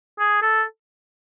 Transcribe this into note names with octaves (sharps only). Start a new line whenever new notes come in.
G#4
A4